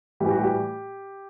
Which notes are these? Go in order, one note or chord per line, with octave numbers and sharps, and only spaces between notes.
A2 E3 G3 G4
F#4
G4